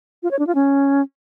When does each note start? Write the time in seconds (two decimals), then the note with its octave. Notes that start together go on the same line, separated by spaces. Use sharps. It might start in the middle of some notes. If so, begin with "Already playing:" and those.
0.23 F4
0.31 C#5
0.39 D4
0.47 F4
0.55 C#4